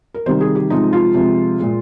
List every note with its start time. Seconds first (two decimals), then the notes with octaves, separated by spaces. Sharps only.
0.14 A#4
0.26 C3 D#3 G3 C5
0.41 G#4
0.55 G4
0.70 C3 F3 G#3 D#4
0.93 F4
1.14 C3 F3 G#3
1.59 A#2 G#3